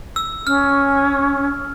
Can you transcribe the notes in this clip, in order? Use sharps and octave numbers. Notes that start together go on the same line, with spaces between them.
E6
C#4 F6